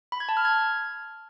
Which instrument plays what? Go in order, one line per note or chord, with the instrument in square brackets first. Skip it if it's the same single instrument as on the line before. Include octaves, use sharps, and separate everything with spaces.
[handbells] B5
G#6
A5
F6
G#6